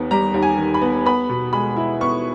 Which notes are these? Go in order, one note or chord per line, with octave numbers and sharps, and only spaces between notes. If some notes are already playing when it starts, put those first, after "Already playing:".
Already playing: D#2 D#3 B3
G3 A#5
D#2
G#5
D#3
B5
B3
B3 B5
B2
G#3 B5
E4
B3 C#6